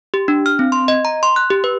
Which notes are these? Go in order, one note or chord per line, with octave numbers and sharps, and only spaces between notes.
G4
D4
F6
C4
C6
D#5
A#5
C6
F#6
G4
B4